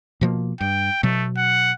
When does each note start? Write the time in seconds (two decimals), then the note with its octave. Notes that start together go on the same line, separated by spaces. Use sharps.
0.21 B2 F3 A#3
0.61 G2 G5
1.03 B2 F#3 A3
1.37 F#5